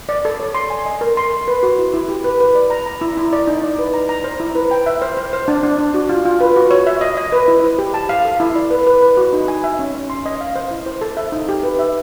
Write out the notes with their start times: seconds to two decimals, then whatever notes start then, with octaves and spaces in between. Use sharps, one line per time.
0.09 D5
0.25 A4
0.40 C#5
0.55 C6
0.70 G#5
0.86 D#5
1.01 A#4
1.17 C6
1.32 C6
1.48 B4
1.63 F#4
1.78 E4
1.94 E4
2.09 G4
2.24 B4
2.40 B4
2.55 D5
2.70 A#5
2.86 A#5
3.01 E4
3.17 E4
3.33 D5
3.47 D#4
3.64 D5
3.79 B4
3.94 A#5
4.09 A#5
4.24 C5
4.40 E4
4.55 B4
4.71 G5
4.86 E5
5.02 C5
5.17 C5
5.33 C5
5.48 D4
5.63 D4
5.78 D4
5.94 F#4
6.09 F4
6.25 F4
6.41 B4
6.56 F#4
6.71 C#5
6.87 E5
7.01 D#5
7.17 D#5
7.32 B4
7.48 E4
7.64 C5
7.79 G4
7.94 A5
8.09 F5
8.25 A4
8.40 E4
8.56 D5
8.71 B4
8.87 B4
9.02 B4
9.17 F#4
9.33 D#4
9.48 G#5
9.64 E5
9.79 C#4
9.95 C#4
10.10 C6
10.26 D#5
10.41 F5
10.56 C5
10.71 E4
10.86 C5
11.01 A4
11.17 E5
11.32 D#4
11.49 G4
11.63 B4
11.79 E5